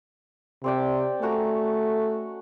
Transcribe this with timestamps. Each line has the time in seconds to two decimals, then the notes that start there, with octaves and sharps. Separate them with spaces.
0.64 C3 C4 D5 G5
1.22 A3 C#4 F#4 A#5